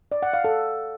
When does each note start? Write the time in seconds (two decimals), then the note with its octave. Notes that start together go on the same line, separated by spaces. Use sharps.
0.12 D5
0.23 F#5
0.33 F5
0.44 A4